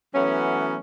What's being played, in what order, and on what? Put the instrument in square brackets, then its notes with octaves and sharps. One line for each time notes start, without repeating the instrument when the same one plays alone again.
[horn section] E3 F#3 A3 B3 C#4